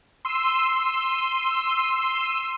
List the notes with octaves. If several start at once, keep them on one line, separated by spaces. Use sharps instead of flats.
C6 E6 D#7